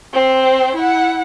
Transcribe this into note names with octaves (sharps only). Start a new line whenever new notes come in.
C4 C5
E4 F#5